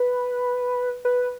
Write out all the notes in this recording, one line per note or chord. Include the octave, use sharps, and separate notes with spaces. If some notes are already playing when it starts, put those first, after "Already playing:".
Already playing: B4
B4